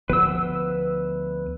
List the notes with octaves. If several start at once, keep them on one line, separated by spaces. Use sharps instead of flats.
D2 F3 B3 B4 E6